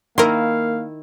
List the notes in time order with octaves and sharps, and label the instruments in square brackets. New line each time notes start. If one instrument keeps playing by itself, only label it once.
[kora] D#3 E4 [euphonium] A#3 [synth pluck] A#4 C6 [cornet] F5